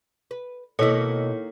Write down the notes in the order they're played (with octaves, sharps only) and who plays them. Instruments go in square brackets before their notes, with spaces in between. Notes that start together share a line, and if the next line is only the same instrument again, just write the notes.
[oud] B4
[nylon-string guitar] B2 D#5 [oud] D#3 A#3 [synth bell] E4 C#5 [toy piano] A4